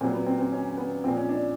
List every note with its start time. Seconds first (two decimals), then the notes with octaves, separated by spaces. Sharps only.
0.01 A#2 C4
0.04 F#3
0.13 B3
0.26 C4
0.39 C4
0.52 C#4
0.77 B3
1.04 A#2 F3 C4
1.16 C#4
1.29 D4